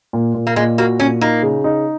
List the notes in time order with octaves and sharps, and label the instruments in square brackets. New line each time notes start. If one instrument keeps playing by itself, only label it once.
[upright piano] A#2
A#2
[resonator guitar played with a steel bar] A#3
[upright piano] A#2 [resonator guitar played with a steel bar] G#3
[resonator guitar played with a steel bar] A#3 [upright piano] F#4
[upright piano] A#2 [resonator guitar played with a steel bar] C#4
[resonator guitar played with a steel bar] A#3 [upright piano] D#4
[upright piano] C#3
D#4